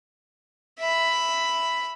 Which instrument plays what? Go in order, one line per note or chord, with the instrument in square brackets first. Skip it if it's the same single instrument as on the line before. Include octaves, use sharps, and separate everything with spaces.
[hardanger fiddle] E5 B5